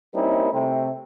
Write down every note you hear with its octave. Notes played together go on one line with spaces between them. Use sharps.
G3 A#3 C4 C#4 D#4 E4
C3 A3 C4